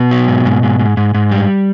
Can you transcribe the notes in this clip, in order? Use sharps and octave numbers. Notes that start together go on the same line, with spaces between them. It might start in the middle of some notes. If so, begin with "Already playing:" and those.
Already playing: B2 B3
F#3
G#2
G#2
G#2
G#2
G#2
G#2
G3